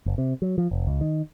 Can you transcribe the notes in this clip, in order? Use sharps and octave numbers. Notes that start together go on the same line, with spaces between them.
F#1
C3
F#3
F3
F1
C#2
D#3